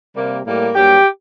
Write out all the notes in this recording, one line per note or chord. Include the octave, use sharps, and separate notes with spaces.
C3 G3 A#3
A2 G3 A#3
G2 F#3 A#3 G4